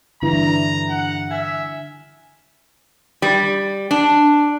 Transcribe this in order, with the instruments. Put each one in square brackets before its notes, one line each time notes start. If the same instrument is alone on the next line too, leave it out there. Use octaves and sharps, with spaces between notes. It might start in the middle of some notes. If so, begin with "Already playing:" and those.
[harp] G2 E3 [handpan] D3 D4 E4 [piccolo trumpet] A#5
[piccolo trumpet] F#5
[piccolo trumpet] E5 [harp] G#5 F6
[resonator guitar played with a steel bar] G3
D4